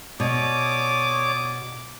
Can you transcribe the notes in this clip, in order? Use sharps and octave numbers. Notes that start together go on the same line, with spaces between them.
B2 C#5 D5 D6 D#6